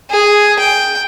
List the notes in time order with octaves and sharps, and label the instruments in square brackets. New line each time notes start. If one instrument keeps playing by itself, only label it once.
[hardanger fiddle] G#4
G5